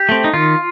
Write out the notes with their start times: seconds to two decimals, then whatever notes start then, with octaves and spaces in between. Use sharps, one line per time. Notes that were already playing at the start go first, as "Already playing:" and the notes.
Already playing: G4
0.09 A3 C4
0.24 D#4
0.34 D#3 F4